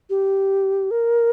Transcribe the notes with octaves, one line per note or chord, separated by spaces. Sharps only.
G4
A#4